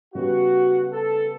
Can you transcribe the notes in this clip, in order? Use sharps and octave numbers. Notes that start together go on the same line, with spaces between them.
C#3 G3 B3 F#4
A4